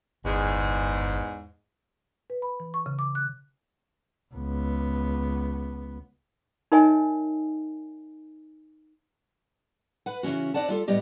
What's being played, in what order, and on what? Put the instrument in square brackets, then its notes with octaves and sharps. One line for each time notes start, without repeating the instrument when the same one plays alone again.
[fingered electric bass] G1 [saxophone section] E2 G#2 G#3
[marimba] B4
B5
E3
C#6
C#3
D6
F#6
[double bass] C#2 B3
[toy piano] D#4 A#4 C#5 D#5 E5 G#5
[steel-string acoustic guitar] B4 F#5
C#3 E3 F3 C#4 F#4
C4 D4 D5 F#5 A5
G3 F4 A4
A2 G3 B3 G4 D#5